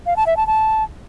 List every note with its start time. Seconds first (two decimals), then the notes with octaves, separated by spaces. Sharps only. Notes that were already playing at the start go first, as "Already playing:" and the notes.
0.06 F5
0.16 A5
0.27 E5
0.37 A5
0.47 A5